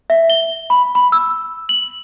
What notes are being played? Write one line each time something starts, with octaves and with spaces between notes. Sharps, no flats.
E5
G7
B5
B5
E6
F#7